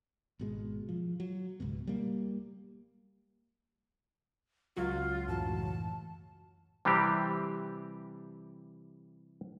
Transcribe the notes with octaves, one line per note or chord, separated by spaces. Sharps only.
G#1 B2 G#3
F3
F#3
C#2 G#2 B2
G3 A#3
C#2 F#3 F4 F#4
F#2 A2 E3 A5
C3 E3 G3 C4 G4